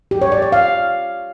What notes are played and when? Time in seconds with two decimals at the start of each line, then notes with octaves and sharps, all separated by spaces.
0.11 G4
0.22 C#5
0.32 D5
0.42 D5
0.52 F5